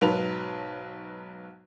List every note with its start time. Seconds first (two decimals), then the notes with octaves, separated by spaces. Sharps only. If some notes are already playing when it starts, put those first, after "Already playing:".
0.01 B1 G#2 F#3 B4 A5 F7